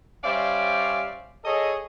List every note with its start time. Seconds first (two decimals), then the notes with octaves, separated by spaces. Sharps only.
0.24 G3 C#4 C5 D5 E5 F5
1.45 G#4 A4 C#5 D#5